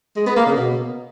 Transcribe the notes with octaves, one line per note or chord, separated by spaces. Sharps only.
G#3
B3
A#3
C#3
B2